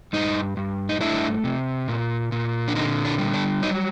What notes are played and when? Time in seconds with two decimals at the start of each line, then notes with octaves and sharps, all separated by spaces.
0.13 G2 D#4
0.57 G2
0.89 D#4
1.01 A3 D4 E4
1.44 C3
1.88 A#2
2.32 A#2
2.68 D4
2.76 D3 D#4
3.05 D4
3.19 G3
3.34 D4
3.63 F#3 D#4